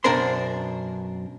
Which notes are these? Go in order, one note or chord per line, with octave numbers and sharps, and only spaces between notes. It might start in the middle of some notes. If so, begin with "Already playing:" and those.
F#2 B2 D4 A#4 C5 C6